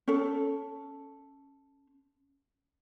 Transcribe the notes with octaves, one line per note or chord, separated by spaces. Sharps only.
C#4 A4